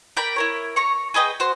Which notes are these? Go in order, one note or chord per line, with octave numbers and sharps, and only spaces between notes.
A#4 D5 G5 B5
E4 A#4 C#5
C#5 A#5 C#6
G#4 B4 D#5 G5
F#4 C5